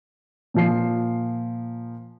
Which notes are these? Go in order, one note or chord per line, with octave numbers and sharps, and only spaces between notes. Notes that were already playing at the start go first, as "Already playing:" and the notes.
A#2 F3 C7